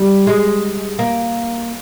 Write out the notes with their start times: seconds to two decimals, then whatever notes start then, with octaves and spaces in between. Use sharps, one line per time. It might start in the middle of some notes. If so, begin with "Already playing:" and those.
Already playing: G3
0.27 G#3
0.99 A#3